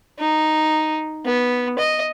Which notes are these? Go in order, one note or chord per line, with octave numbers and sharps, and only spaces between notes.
D#4
B3
D#5